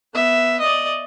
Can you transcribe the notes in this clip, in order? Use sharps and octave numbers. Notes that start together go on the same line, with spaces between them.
B3 E5
D5 D#5